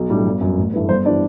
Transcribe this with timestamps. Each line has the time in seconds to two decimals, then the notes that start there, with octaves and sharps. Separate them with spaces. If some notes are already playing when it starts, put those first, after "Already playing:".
Already playing: B1
0.09 A2 G3 D4
0.25 G1
0.41 F#2 F#3
0.57 A1
0.73 G2 E3 A3
0.89 G1 C5
1.05 E3 G3 D4 D5